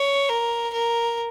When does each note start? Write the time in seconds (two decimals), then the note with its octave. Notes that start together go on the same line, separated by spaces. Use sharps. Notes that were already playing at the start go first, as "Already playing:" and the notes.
Already playing: C#5
0.29 A#4
0.73 A#4